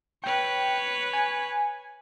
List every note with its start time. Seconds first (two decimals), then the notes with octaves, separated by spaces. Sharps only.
0.24 B4 C#5 G5
1.13 G#5